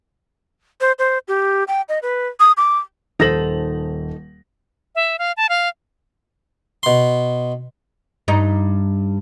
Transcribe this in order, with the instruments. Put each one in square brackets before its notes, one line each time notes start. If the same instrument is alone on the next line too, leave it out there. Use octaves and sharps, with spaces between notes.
[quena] C5
C5
G4
G5
D#5
B4
D#6
D6
[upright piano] D#1 A#6 F#7 [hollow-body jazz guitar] D#4 A4 C5
[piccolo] E5
F5
A5
F5
[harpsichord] B2 C6
[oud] G2 D#4